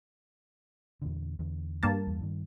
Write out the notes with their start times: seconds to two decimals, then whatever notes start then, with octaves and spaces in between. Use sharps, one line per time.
1.02 E2 A#2 D3
1.39 E2 D3
1.83 G2 A#3 A5
2.07 E2
2.21 G2 D#3